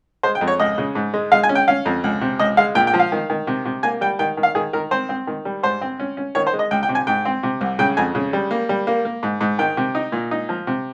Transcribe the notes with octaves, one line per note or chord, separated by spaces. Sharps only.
G#3 C5
G5
F2
C#5
C#2 D#5
C#3
G#2
G#3
G#3 F5
G#5
C#4
G5
C#4 F5
F2
C#2
C3
C#2 D#5
G#3 F5
A#2 G5
G5
F3
F5
D#3
D#3
C3
C3
A#3 G#5
G3 G5
D#3 G5
D#3
F5
D#3 G#4
D#3 A#4
C4 C5
C4
D#3
G3
G#2 C5
C4
C#4
C#4
D#3 C#5
C5
G#3
D#5
C#2 G5
G5
C3
G#5
G#2 G5
C4
C3
C2
C#3 G5
F2 G#5
C#3
G3
A#3
G3
A#3
A#3
G#2
G#2
D#3 G5
C3
D#4
A#2
D#4
F3
C3